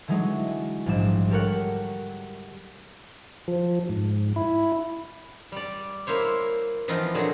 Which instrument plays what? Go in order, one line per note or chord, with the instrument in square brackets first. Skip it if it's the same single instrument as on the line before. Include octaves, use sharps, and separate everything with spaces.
[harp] D3 E3 F#3 G#3 D#4
A#1 G#2 F3 G3 D4 E7
G4 A4 A#4 C#5 F#5
[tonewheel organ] F3
G#2
E4
[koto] G3 D5
A#3 E4 C5 C#5
E3 F3 B3 C4 D#4 F4
A#2 D3 F#3 G#4